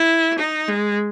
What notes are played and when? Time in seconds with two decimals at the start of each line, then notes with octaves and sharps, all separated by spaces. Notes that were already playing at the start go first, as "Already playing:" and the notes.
Already playing: E4
0.38 D#4
0.68 G#3